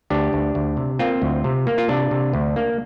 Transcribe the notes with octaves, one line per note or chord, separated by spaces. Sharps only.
D2 D4 G4
D2
D2
C3
A#3 C4 F4
D2
C3
A#3
F4
C3 D4
C3
D2
A#3